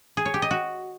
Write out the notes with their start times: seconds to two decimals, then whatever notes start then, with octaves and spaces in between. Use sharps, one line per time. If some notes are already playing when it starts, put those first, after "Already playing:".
0.17 G#4
0.25 C#5
0.34 G4
0.42 D#5
0.51 F#4